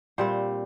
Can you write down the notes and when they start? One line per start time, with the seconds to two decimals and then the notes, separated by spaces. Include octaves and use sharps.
0.18 A#2 G3 C4 C5